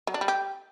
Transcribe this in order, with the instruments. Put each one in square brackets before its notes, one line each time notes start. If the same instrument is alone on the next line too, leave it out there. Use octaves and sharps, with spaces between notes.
[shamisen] F#3
D4
G3
G4